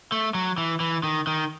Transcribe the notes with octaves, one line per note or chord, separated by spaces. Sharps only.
A3
F#3
E3
E3
D#3
D#3